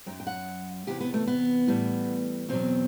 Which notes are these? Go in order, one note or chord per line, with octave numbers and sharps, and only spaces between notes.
F#2 F#3 G5
G5
F#5
E2 C3 E3 G4
B3
A3
B3
A2 E3 G3
E2 B2 F#3 C4